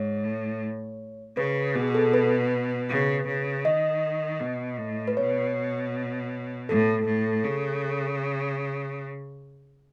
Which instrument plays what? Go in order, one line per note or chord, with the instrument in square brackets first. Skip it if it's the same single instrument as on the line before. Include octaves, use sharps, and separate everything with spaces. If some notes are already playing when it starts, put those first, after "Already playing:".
Already playing: [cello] G#2 [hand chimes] C#5
[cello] A2
[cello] C#3 [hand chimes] B4
[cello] B2 [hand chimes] G#4
[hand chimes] A4
B4
[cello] C#3
C#3
[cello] D#3 [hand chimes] D#5
[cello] B2
A2
[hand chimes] B4
[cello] B2 [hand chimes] C#5
[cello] A2 [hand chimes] A4
[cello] A2
C#3